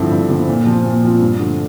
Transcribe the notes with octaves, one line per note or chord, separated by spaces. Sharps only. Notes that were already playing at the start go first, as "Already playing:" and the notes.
Already playing: G2 D3 F3 C4 E4
G2
D3 F3 C4 E4
A#2
F3 C4 F4
A#2
F3 C4 F4
G2
D3 F3 A3